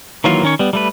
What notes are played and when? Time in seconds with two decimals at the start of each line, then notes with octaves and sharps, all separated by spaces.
0.24 D#3 E3 F#3 A#3 F4
0.43 D#3 C#4 C#5
0.59 G3 B3
0.73 G3 A3 B4